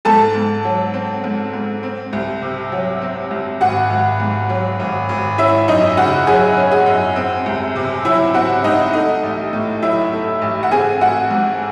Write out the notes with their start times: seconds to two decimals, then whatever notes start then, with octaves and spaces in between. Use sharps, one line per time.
0.05 G#2 A4 A5
0.35 G#2
0.64 F#3
0.94 C4
1.24 G#2
1.53 G#2
1.83 C4
2.13 C2
2.42 C3
2.72 F#3
3.01 C4
3.31 C2
3.61 G#1 F#4 F#5
3.90 G#1
4.20 G#2
4.49 F#3
4.80 G#1
5.09 G#1
5.38 C#4 E4 E5
5.68 F#2 D#4 D#5
5.97 C#3 F#4 F#5
6.27 F#3 G#4 G#5
6.57 C#4
6.71 G#4 G#5
6.86 F#2
7.16 C4
7.46 C2
7.76 C3
8.05 F#3 E4 E5
8.34 C4 F#4 F#5
8.64 C2 D#4 D#5
8.93 A3 D#4 D#5
9.23 A1
9.53 A2
9.82 F#3 E4 E5
10.12 A3
10.42 A1
10.63 F#5
10.71 C4 G#4 G#5
11.01 A1 F#4 F#5
11.31 G#2